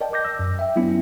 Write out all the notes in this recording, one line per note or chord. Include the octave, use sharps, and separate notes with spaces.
A#4 D5 D#5 G5 A5
D#5 D6 G6 A#6
E6
F#2
E5 G5
F#3 B3 C#4 D4 E4